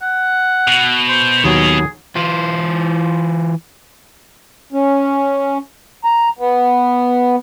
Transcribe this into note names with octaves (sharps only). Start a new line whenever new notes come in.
F#5
B2
C5
D#2 F#3 G#4
E3 F4
C#4
A#5
B3